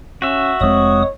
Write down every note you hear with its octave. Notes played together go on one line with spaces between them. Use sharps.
C#4 F#4 E5
F1 A2 G#3 C4 C#5 D#6